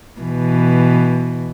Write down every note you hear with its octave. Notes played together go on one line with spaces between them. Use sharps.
B2 E3